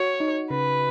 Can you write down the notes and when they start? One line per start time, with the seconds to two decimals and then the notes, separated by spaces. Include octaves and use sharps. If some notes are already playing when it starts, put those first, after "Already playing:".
Already playing: F#4 C#5
0.20 D#4
0.50 C#3 B4